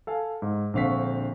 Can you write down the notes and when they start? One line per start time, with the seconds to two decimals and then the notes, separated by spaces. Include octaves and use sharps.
0.07 A4 F5 G#5
0.42 G#2
0.74 A#1 D3 C4 F5 C#6 B6